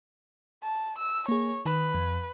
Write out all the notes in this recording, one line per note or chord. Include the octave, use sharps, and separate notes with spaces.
A5
E6
A#3 G#4 C#5
D#3 B4
F2